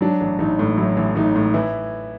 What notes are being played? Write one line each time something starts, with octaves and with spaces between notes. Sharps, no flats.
F#3 D4
A1
A1 D#4
A2
F#3 E4
A1
A1 D#4
A2
E3 E4